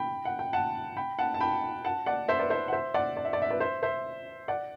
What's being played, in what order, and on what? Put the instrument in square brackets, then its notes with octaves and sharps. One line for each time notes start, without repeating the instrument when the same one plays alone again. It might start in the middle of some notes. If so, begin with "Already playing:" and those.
Already playing: [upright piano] G5 B5
F#5
G5
F#5 A5
G5 B5
F#5 A5
A5
G5 B5
F#5 A5
D5 F#5
C5 E5
B4 D5
C5 E5
F#5
C5 E5
D5 F#5
D5
E5
D5
E5
B4 D5
C5 E5
C5 E5
D5 F#5